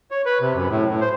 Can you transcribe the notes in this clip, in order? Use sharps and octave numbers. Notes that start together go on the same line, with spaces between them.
C#5
B4
C3
F#2
A2
A2
C5